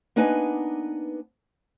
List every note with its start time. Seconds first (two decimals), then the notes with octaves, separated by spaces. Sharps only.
0.16 A#3 B3 D4 D#4 B4 G#5